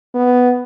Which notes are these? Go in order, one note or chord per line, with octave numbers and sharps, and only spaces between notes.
B3